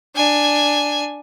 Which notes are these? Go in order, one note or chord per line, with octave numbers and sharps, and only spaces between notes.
D4 G#5